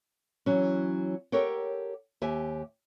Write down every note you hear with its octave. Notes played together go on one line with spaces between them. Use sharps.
E3 F#3 C#4
G4 A4 A#4 C#5 F#5 G5
D#2 G4 E5 G#5